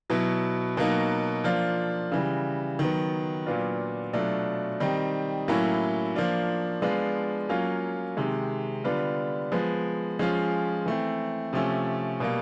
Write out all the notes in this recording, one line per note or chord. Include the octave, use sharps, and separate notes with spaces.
B2 F#3 B3 E4
B2 F#3 A#3 D#4
F3 A#3 D4 F4
C#3 E3 G3
D#3 F#3 B3
A#2 F#3 B3 D4 F4
B2 F#3 A3 D4 F4
D#3 G3 C4 D#4
A2 F#3 A#3 C#4 E4
F3 A#3 D4 F4
F3 G#3 B3 D4 F4
F#3 A#3 C#4 F4
C3 D#3 G#3
D3 G3 B3 D4 F4
F3 G#3 B3
F3 G#3 C#4 F4
E3 A3 C4
C3 F3 A3 C#4
B2 G3 A#3